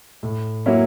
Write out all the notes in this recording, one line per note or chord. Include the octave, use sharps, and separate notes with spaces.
A2
F#3 A#3 C#4 E4